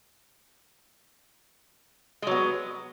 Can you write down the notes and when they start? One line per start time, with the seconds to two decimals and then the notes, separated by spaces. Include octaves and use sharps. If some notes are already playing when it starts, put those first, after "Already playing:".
2.22 G#3
2.27 F#3
2.31 B3